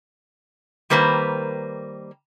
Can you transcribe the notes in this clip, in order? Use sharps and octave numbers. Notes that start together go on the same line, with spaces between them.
D#3 G3 A#3 B4 C5